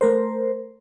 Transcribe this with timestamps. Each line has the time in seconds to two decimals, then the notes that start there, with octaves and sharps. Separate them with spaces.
0.01 A3 A#4 C5